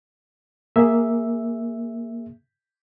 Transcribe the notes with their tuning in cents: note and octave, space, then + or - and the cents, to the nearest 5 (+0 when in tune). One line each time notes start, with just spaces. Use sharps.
A#3 +0 G#4 +0 E5 +0